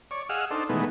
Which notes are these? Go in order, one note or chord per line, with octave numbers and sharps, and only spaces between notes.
C#5 D5 C#6
G#4 D#5 F5 F#5 E6 F6
D4 D#4 A4 C5
B2 D#3 E3 G#3 A3 B3